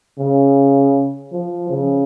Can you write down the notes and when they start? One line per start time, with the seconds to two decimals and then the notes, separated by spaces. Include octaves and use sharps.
0.19 C#3
1.32 F3
1.70 C#3